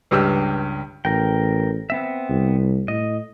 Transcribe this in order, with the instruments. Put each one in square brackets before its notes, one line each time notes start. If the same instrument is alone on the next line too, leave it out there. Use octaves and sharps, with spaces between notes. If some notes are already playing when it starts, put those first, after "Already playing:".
[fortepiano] C#2 G2 G4 E6 F6
[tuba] A1 [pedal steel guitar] A#4 G5
[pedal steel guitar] B3 C4 E5
[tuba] C2
[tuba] A2 [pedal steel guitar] D#5